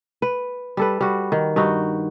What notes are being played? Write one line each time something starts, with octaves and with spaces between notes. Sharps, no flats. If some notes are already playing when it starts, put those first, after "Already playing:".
B4
G3 A4 B4
G3 F#4
D#3
G2 D#4 F#4